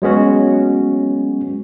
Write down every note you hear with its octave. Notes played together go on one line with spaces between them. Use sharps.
F#3 G#3 B3 C#4 F#4